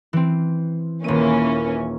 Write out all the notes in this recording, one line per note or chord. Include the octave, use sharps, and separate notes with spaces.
E3 C4
D#1 E3 A#3 C#4 D#7